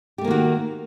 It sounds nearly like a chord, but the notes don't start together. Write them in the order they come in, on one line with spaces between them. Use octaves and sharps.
G4 A3 A#3 D#3 F#4